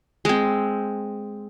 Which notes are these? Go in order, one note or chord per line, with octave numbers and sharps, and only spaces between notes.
G#3 C4